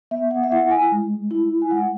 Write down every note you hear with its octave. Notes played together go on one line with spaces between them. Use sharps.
B3 E5
F#5
E5
E4 F#5
G#5
G#3
E4
G#5
G#3 F#5